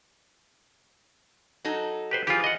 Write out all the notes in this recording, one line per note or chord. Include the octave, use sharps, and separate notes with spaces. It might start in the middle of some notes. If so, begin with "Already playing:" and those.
F#3 D#4 A4
G4 B4 C5
E3 F3 F4 G4 G#4
D#5 F#5